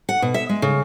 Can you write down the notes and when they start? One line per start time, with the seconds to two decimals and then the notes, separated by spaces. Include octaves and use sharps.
0.09 F#5
0.22 B2
0.34 E5
0.49 G#3
0.62 C#3